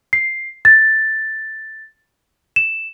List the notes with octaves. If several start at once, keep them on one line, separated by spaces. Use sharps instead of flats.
C7
A6
E7